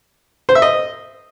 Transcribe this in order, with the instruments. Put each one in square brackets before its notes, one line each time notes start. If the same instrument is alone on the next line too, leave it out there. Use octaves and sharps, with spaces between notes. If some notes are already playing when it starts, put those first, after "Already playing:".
[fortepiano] C5
E5
D#5